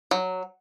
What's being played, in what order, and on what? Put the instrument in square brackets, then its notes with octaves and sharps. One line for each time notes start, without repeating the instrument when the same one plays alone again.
[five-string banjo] F#3